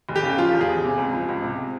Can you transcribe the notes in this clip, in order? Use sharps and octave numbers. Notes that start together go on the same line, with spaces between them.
F1
G4
C#3
F3 F4
E2
G#4
F1
C3
C#2
F3
C#2
C3